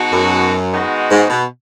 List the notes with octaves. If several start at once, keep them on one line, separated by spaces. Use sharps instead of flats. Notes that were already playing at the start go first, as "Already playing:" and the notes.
Already playing: B2 G#3 D#4 F#4
F#2
D#3 G#3 B3 D#4 F#4
G#2
B2